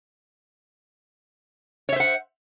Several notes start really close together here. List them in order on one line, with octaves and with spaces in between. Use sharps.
C#5 E5 C5 F#5